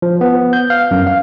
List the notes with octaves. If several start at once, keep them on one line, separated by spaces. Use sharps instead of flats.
F3
B3
G6
F5
F#2
F5